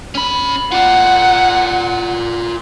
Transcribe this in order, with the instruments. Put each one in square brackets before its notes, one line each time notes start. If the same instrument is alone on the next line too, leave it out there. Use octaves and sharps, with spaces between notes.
[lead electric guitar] C#4 B5
[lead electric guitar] F4 D5 [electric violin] F#5